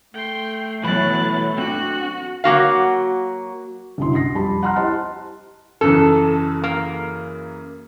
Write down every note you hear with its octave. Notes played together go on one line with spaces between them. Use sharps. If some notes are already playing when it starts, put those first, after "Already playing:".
A3 G5 C6
B2 E3 F#3 B5 F#6 A6
C4 D4 F#4 F#6
F#3 A#3 F#4 F5
G1 C2 F#2 B2 E4 C6
C6 A#6 C7
F2 G3 G4 A5 B5
F#5 A#5 C6 F6 F#6
E4 G4 C5 D#5 A5 C6
F#2 C#3 E3 A4
A#3